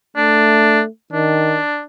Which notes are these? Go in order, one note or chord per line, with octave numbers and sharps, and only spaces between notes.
A3 D4
D#3 D4